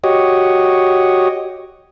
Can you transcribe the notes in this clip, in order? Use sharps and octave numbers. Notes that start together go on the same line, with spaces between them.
F#4 G4 C#5 D#5